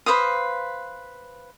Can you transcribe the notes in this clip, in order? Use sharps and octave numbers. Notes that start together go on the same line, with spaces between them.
B4 C5 F5 D#6